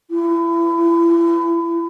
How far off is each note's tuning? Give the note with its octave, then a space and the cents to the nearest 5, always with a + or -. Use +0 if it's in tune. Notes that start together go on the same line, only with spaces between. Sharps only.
E4 +30